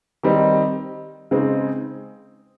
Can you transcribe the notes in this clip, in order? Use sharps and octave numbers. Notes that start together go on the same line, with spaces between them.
D#3 G3 C4 D#4
C#3 G#3 C4 D#4